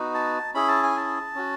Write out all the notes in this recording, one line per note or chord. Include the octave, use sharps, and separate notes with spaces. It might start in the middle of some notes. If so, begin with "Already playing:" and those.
Already playing: B3 D#4 F#4
A5
C#4 E4 G#4 B5
A5
G#5
A5
C#4 F#4